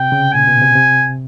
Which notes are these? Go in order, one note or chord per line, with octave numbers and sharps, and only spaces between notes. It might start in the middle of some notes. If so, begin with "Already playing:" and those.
Already playing: C3 G5
C#3
A#2 G#5
B2
C3
C3